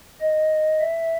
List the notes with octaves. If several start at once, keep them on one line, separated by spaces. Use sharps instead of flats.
D#5
E5